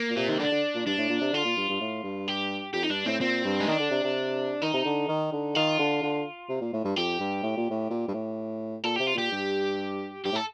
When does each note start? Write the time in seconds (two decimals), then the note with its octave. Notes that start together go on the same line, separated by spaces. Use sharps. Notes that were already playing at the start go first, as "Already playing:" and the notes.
Already playing: A#3
0.10 A#2
0.16 C3 F4
0.29 D#4
0.39 D3 D4
0.52 D3
0.75 A#2
0.87 G2 D4
0.98 A2
1.10 A#2
1.21 C3
1.33 D3 F4
1.45 A#2
1.57 G2
1.69 G2
1.81 A2
2.04 G2
2.28 G4
2.74 F2 G4
2.83 D#4
2.90 G2 D4
3.06 A2 C4
3.21 A#2 C4
3.45 G2
3.60 D#4
3.68 D#3 D4
3.80 D3
3.91 C3
4.04 C3
4.62 D#3 D#4
4.74 C3
4.85 D3
5.08 D#3
5.33 D3
5.55 D#3 F4
5.79 D3
6.03 D3
6.49 C3
6.61 A#2
6.73 A2
6.85 G2
6.97 F2 G4
7.20 G2
7.43 A2
7.57 A#2
7.70 A2
7.91 A#2
8.08 G2
8.14 A2
8.84 A#2 A4
8.96 C3 G4
9.07 F4
9.15 A#2 G4
9.32 G2
10.25 G2 G4
10.32 A2
10.35 A4